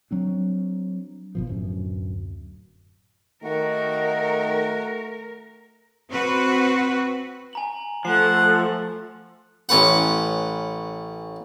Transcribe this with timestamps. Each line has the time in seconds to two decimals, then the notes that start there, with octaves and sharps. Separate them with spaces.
0.11 F#3 C4 D4
1.35 G1 B2 F3
1.47 D1 F#2
3.44 D#3 A3 F#4 A#4
6.10 C4 F#4 B4
7.53 G#5 A#5 F#7
8.05 F3 A3 F#5 C7
9.69 A1 C#4 B4 F#5